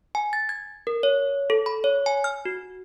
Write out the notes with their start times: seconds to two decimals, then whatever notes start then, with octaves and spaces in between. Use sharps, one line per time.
0.15 G#5
0.33 A6
0.49 G#6
0.87 A#4
1.03 C#5
1.50 A4
1.66 B5
1.84 C#5
2.06 G#5
2.24 F6
2.45 F#4